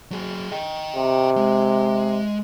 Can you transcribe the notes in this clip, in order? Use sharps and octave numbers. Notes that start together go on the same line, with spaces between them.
F#3 G#4
D#5 G5
C3
G#3